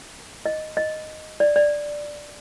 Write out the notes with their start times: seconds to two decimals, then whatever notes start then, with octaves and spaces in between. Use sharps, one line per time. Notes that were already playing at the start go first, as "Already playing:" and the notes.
0.46 D#5
0.77 D#5
1.40 D5
1.56 D5